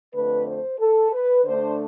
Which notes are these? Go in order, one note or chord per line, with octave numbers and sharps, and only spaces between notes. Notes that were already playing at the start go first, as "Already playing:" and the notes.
F2 D3 A3 B4
C5
A4
B4
D3 A3 D4 C5